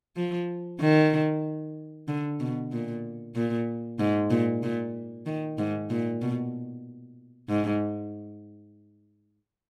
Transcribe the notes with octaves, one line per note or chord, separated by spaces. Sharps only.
F3
D#3
D3
B2
A#2
A#2
G#2
A#2
A#2
D#3
G#2
A#2
B2
G#2